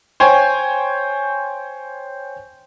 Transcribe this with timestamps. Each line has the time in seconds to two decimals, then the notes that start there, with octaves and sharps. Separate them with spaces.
0.20 C5 C#5 G5 G#5